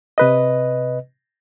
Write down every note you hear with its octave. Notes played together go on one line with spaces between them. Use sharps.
C3 B4 D#5